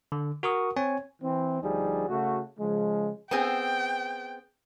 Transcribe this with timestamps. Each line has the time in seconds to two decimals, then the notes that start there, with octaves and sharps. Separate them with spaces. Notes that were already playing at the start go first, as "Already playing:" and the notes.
0.12 D3
0.43 F#4 A#4 C#6 D#6
0.76 C4 C#5 G#5
1.22 E3 C4
1.62 D2 F3 G3 D#4 G#4
2.08 C#3 A3 F#4
2.59 C#3 F3 G#3
3.31 B3 C4 G#4 G5